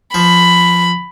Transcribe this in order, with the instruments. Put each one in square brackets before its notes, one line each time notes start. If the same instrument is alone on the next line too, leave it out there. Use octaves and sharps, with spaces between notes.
[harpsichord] F3 [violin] B5